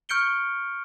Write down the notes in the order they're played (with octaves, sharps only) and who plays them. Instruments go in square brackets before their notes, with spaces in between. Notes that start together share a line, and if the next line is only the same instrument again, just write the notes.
[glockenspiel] C#6 F6 G6 C#7 D7 G7